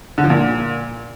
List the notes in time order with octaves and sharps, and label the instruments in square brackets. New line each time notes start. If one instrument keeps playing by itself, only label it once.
[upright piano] D3
F3
A#2